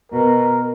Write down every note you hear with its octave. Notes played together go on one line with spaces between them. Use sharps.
B2 A#4